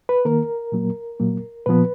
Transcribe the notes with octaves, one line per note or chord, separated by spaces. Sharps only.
B4
D#3 A#3 A#4
A#2 F#3 A#3
A#2 F#3 A#3
A#2 F3 B3 B4